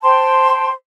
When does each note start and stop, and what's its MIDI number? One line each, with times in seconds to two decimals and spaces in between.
0.03 0.71 72
0.03 0.71 79
0.03 0.71 81
0.03 0.71 84